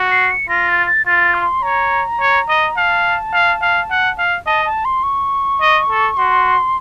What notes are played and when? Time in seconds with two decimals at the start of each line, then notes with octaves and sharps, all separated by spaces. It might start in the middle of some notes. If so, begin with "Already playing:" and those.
Already playing: F#4
0.11 C7
0.31 C#7
0.49 F4 A#6
0.69 A6
0.87 A6
1.06 F4 A6
1.34 C6
1.63 C#5 A#5
2.20 C#5
2.49 D#5
2.77 F5 A5
3.33 F5
3.61 F5
3.91 F#5
4.18 F5
4.46 D#5 A5
4.65 A5
4.85 C6
5.03 C#6
5.61 D#5
5.90 A4
6.17 F#4 C6